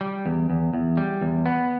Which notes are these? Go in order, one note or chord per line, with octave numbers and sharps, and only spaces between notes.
G3
E2
E2
E2
G3
E2
B3